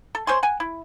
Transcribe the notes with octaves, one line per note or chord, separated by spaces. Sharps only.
A4
C5 C#5 G#5 C6
F#5 G#5
E4